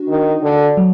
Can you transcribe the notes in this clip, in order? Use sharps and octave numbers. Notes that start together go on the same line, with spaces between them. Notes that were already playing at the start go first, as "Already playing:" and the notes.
Already playing: D4 F#4
D#3
D3
F#3